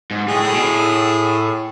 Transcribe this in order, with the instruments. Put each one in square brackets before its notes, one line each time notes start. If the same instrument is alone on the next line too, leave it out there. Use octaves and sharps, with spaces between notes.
[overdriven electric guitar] G#2
[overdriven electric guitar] A2 [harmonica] G#4
[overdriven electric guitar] A2
B2
A2